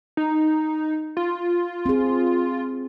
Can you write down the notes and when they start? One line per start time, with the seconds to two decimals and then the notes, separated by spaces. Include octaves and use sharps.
0.17 D#4
1.17 F4
1.86 C4 G#4